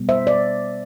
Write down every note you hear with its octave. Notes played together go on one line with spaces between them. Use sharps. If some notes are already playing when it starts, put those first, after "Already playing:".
Already playing: B2 G3 B3
C5 E5
D5